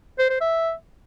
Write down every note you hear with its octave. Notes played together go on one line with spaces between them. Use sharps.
C5
C5
E5